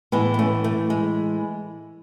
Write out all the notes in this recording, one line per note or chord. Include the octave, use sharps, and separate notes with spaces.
A2 E3 G#3 B3
B3
A3 C#4
A3
G#3